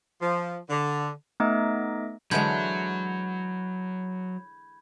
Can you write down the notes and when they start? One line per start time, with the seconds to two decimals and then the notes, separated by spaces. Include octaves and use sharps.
0.22 F3
0.70 D3
1.40 A3 B3 D#4 D#5 E5 D6
2.31 D3 E3 F#3 G#3 B5 G6 G#6